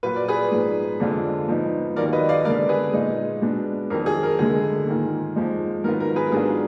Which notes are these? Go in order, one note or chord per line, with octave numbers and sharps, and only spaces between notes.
A#2 F#3 A#3 F4 B4
D5
G#4 B4
G#2 F3 B3
F2 D3 G#3 D4 F4
G#2 F3 B3 D#4
D#2 D#3 F#3 A#4 D5
B4 D#5
D5 F5
D3 G#3 B3 A#4 D5
G#4 B4
A#2 G#3 D#4
B2 G#3 B3 D4
F2 D#3 F#3 A#4
G#4
A#4
D2 D3 G#3 G#4
G#2 D#3 A#3 F4
F2 F3 G#3 D#4
G#2 D#3 F#3 B3 F4 A#4
A#4
G#4 B4
G#2 F#3 B3 D4 F4 G#4